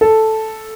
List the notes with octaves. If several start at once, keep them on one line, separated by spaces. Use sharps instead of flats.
A4